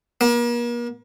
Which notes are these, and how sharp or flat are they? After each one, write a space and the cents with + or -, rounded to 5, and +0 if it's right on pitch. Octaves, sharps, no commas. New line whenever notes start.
A#3 +40